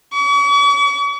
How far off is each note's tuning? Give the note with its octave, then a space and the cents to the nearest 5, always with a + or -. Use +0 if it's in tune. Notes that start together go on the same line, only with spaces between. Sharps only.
C#6 +45